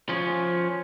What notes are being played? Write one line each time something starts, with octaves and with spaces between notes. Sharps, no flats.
F3 C#4